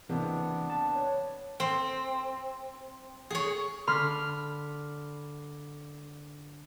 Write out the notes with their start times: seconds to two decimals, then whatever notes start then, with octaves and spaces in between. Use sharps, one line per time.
0.09 C#2 C3 E3 A#3 B3 D4
0.70 A5
0.95 C#5
1.60 C4
3.30 G#4 C#5
3.87 D3 B5 C6 F6